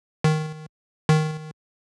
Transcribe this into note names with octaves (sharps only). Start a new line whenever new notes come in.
D#3
D#3